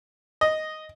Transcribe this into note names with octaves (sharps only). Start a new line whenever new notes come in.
D#5